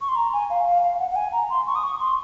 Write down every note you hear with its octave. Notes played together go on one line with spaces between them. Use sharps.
C#6
C6
A#5
G#5
F5
F5
F5
F#5
F#5
G#5
A#5
C6
C#6
D#6
C#6
C6